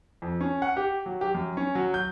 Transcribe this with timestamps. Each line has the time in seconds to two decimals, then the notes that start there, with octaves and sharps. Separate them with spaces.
0.22 F2
0.41 C#4
0.62 F#5
0.77 G4
1.06 F#3
1.21 G4
1.35 F#2
1.57 C#4
1.75 F#3
1.94 G6